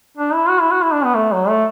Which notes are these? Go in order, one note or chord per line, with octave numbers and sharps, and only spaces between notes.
D4
E4
F#4
E4
F#4
E4
D4
B3
A3
F#3
A3